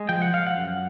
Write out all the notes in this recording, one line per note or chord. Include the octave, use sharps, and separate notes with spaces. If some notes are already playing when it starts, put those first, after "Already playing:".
Already playing: G#3
F3 G5
F#5
F3 F5
F#5
F#2